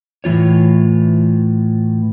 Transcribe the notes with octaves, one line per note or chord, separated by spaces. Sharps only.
A2 E3 G3 F4 C#5